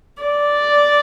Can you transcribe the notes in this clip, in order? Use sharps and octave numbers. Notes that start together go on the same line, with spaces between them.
D5